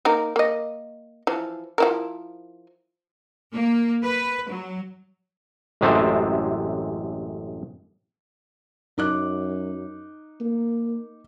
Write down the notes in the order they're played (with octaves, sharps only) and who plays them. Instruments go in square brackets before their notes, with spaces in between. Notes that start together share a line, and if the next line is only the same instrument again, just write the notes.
[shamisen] A#3 D#4 A#4
A#3 D#5
E3 F3
F3 E4 A#4
[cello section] A#3
B4
F#3
[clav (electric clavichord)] A1 F#2 C3 G#3 A3 C5
[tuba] F#2 [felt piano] D#4 D6 F#6
[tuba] A#3